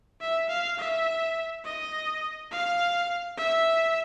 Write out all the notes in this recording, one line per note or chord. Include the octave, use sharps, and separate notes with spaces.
E5
F5
E5
D#5
F5
E5